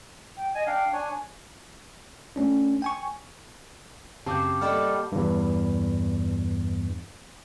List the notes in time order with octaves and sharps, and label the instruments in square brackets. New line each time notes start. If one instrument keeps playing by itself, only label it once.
[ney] G5
[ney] D#5 [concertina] G#5
[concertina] D4 F5 [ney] G5
[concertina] D4 C#5 [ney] G#5
[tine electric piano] A3 C#4 D4
G5 G#5 C#6
[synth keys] F#2 C#3 C4 [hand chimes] G4 G5 [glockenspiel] A5 D6 G6
[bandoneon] G3 [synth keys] A#3 A4 F#5 [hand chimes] G4 D#5 F6
[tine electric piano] E2 G2